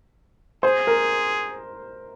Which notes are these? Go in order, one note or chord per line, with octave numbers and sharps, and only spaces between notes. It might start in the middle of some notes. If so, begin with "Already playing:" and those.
G#4 C5
A#4